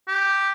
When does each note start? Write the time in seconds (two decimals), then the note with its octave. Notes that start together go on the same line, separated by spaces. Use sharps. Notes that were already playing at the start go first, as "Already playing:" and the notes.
0.08 G4